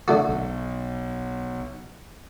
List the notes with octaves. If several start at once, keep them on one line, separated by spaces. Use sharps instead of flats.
D3 A3 F#4
B1